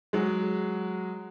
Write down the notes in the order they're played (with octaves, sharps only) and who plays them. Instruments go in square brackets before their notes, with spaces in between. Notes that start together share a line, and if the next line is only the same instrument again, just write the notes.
[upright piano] F#3 G#3